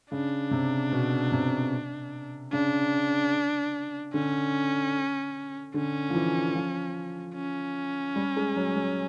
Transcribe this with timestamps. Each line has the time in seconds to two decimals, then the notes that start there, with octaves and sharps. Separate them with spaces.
0.11 C#3 D4
0.51 C3
0.92 B2
1.32 C3
2.52 C#3 D4
4.14 D3 C#4
5.74 D3 C#4
6.10 F3
6.15 E3
6.55 F3
7.35 C#4
8.16 G3
8.36 G#3
8.56 F#3
8.76 F#3